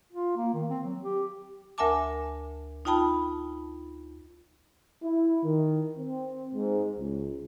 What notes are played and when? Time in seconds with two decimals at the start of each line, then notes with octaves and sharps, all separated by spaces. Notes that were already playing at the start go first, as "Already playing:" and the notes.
0.13 F4
0.37 A#3
0.54 D#3
0.70 C4
0.85 F#3
1.02 G4
1.78 D2 A#4 E5 G#5 A5 D6
2.85 D#4 F4 G5 A5 B5
5.02 E4
5.44 D#3
5.97 C4
6.55 G#2
6.97 C#2